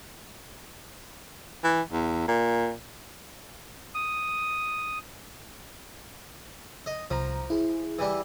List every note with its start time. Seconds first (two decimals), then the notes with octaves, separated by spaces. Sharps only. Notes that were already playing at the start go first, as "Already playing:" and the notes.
1.64 E3
1.92 E2
2.28 A#2
3.95 D#6
6.86 D#5
7.11 C2 F3 A#5
7.50 E4 G#4
7.99 E3 G3